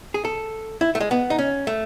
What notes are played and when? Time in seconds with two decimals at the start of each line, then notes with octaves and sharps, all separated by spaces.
0.14 G#4
0.25 A4
0.81 E4
0.95 A3
1.00 G#3
1.11 B3
1.30 D#4
1.38 C#4
1.67 A3